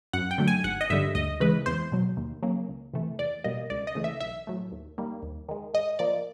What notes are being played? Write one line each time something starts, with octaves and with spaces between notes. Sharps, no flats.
F#2 F#5
G5
D3 F#3 A3
G#5
G#1 F#5
D#5
G2 D3 G3 E5
D2 D#5
C#3 E3 G#3 B4
E2 C5
B2 F#3
D#2
C#3 F#3 A#3
C#2
C3 E3 A3
E2 D5
B2 G3 A#3 D#5
C#2 D5
D#5
C#3 E3 A3
E5
B1 E5
A2 F#3 A3
D#2
D#3 G3 A#3
D#2
D#3 G#3
G#2 D#5
F3 A#3 D5